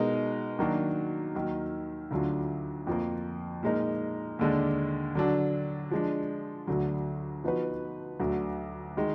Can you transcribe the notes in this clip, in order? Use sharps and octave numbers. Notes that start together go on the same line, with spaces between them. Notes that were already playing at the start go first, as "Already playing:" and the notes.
Already playing: B2 G#3 D#4 A#4
D#3 F#3 A#3 D4 F#4
D#2 D#3 F#3
D2 D3 F#3 D4 F4
F2 F3 A#3
A#2 G#3 D#4 A#4
D#2 D3 G#3 D4
D3 F#3 D4
F3 G#3 D4
D2 D3 F#3
F3 B3 D#4 F#4 B4
D2 D3 F#3
D#3 G#3